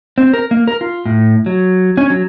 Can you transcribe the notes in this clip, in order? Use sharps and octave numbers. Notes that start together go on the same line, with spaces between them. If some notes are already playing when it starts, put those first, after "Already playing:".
C4
A#4
A#3
A#4
F4
A2
F#3
C#4
F#3